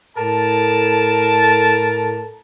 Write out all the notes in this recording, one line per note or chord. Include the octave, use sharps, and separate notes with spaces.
A2 A4 A#4 A5